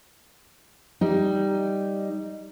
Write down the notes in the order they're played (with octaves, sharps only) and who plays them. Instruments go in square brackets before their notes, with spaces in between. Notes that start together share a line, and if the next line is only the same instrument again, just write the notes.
[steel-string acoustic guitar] G3 D#4